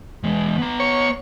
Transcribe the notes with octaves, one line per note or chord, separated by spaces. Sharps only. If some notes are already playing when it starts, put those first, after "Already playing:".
E2 G#3
B3 A#5
C#5